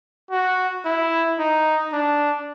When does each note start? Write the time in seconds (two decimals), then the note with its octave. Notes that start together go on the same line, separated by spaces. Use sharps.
0.31 F#4
0.85 E4
1.39 D#4
1.93 D4